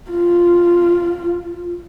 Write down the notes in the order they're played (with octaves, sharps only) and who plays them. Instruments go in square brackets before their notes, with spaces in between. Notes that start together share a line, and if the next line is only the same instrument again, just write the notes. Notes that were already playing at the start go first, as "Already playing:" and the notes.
[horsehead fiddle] F4